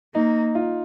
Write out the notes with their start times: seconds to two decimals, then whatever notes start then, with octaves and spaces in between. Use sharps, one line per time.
0.14 A#3 D#4
0.55 F4